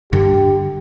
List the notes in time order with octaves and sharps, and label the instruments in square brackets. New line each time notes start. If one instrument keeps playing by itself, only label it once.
[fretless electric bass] G2 D3 [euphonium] G4